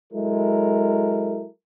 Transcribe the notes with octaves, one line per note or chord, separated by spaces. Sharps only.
F#3 G#3 E4 A4 A#4